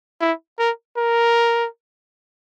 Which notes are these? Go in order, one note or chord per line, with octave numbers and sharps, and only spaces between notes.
E4
A#4
A#4